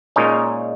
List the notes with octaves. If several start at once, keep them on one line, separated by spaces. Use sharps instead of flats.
A#2 G#3 C#4 D#4